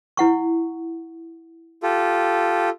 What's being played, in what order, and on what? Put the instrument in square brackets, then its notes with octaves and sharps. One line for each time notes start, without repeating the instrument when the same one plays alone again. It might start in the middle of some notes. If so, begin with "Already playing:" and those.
[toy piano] E4 F#5 C#6
[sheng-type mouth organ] F4 G4 A4